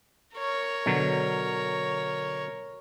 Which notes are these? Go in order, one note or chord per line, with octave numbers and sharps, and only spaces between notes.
A#4 C#5
B2 D3 F#3